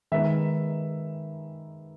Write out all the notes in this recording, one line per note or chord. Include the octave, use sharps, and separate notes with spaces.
D#3 G#3 B3 D#4 E5